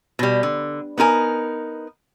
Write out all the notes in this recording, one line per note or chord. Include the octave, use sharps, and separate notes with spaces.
B2 G3
D3
B3 D#4 A#4 G#5